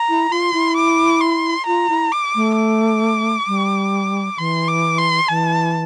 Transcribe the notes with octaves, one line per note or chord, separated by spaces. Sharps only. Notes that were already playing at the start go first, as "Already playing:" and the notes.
Already playing: A#5
E4
F4 C6
E4
D6
C6
F4 A#5
E4
D6
A3
D6
G3
E3 C6
D6
C6
E3 A5